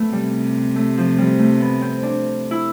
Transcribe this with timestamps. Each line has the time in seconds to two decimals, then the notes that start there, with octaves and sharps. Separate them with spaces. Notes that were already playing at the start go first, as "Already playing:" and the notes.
Already playing: A3 B3
0.12 C3 G3
0.76 A3
0.98 F3
1.18 G3
1.39 A3
1.60 B3
1.81 C4
2.03 D4
2.51 E4